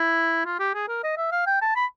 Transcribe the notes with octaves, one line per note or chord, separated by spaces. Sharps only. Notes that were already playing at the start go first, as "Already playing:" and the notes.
Already playing: E4
F4
G4
G#4
A#4
D#5
E5
F5
G5
A5
B5